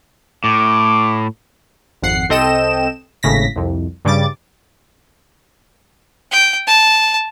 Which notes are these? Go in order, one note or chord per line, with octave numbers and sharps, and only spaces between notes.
A2 D6
G#1 F2 F#5 C7
C2 C4 A4 D#5 G5 E7
G#1 A2 C#3 A#6 B6
C2 F2
G2 C#3 G3 D6 A6
G5
A5